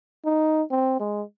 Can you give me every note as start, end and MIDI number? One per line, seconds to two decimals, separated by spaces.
0.25 0.63 63
0.71 0.98 60
1.00 1.22 56